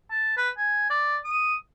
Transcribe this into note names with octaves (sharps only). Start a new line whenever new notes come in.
A5
B4
G#5
D5
D#6